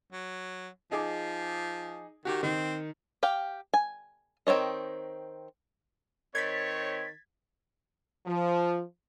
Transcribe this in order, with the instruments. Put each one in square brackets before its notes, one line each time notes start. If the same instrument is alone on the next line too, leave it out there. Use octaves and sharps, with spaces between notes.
[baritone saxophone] F#3
[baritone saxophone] F3 [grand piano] D#4 G#4 D6
[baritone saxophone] D#3 [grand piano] F#4 G4
[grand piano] D#3 [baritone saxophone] C4
[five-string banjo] G4 F5 G5
G#5
D#3 C4 C5 C#5 D#5
[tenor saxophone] D#3 [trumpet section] C4 C#5 [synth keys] G#6 A6 B6
[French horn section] F3